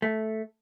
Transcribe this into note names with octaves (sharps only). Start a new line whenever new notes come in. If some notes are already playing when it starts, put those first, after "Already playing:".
A3